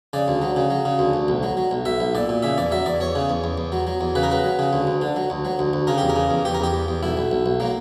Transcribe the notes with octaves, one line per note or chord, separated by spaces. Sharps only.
C#3 D5
D2
F#3
C#3
F#3
C#3
D2
D2
B1
F#3
F#3
B1
B1 E5
B1
A#2 D5
A#2
C#3 E5
E2 D5
F#3 E5
E2 D5
E2 C#5
C#3
E2
E2
E2
F#3
F#3
E2
C#3 B4
A#4
F#3 B4
F#3
C#3
D2
D2
D3
F#3
D2
F#3
D2
D2
C#3 A#4
E2 G4
A#4
C#3
E2
E2 G4
A#4
E2 G4
E2
E2
B1 E4
B1
B1
B1
F#3 A#3